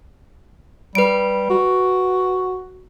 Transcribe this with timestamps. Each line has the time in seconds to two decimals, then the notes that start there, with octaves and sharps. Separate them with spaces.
0.95 G3 B4 D7
1.50 F#4